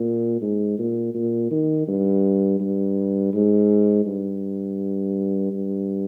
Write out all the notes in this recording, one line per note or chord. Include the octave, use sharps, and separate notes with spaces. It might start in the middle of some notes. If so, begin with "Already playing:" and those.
Already playing: A#2
G#2
A#2
A#2
D#3
G2
G2
G#2
G2
G2